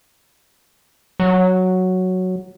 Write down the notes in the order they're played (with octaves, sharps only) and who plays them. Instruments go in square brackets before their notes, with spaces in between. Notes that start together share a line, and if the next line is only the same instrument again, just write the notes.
[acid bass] F#3